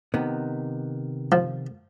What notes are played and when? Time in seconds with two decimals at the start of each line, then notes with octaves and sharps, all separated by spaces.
0.14 C3 D#3 B3
1.32 F3